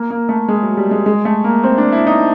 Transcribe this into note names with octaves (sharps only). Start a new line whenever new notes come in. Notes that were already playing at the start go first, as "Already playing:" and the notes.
Already playing: A#3
A#3
A3
G#3
F#3
G3
G#3
G#3
A3
A#3
C4
D4
E4
D#4